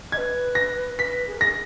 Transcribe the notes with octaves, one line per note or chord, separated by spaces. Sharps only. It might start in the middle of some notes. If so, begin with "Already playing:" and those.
B4 D#5 G#6
A#6
B4 B6
G#4
A#4
G#4 A#6